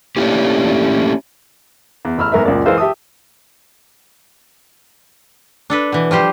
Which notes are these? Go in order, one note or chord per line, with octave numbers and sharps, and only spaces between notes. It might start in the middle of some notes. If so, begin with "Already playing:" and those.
A3 A#3 C#4 D4 E4 G4
E2
A1 B5 E6 F6
E2 G#2 A#4 B4 E5
C#2 F#2 A#2 A#4 D5
E3 G#3 A#4 C5 F5 E6
G4 E5 A5 D#6
D4 A4 B4
B2 E3
F3 G3 G4 C5